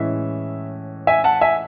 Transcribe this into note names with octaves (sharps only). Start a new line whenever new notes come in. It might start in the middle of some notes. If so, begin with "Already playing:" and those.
Already playing: A2 E3 G#3 C#4 E5
E5 G#5
F#5 A5
E5 G#5